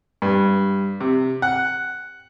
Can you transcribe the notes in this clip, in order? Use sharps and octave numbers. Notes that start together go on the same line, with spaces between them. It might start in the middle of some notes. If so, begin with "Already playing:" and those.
G2
C3
F#5